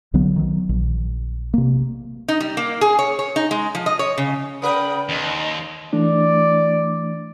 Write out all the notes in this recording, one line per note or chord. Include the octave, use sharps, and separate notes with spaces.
B1 D3 F#3 B3
D#3 F#3
A#1
C3 A#3
D#4
G3
A#3
G#4
C#5
C#5
D#4
G#3
F3
D#5
C#5
C#3
C#3 A#4 B4 G5 B5 D#6
D#2 D#5 C6
E3 A3 D4 D5